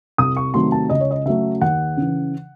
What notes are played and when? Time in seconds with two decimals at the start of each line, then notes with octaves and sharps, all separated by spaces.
0.18 C2 D#6
0.37 C#6
0.54 C3 D#3 F#3 A3 C6
0.72 A5
0.90 C#2 D#5
1.00 C#5
1.11 D#5
1.25 C#3 F#3 A3 E5
1.61 D#2 F#5
1.97 C#3 E3